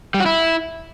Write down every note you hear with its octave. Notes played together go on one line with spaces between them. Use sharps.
G3
F#4
E4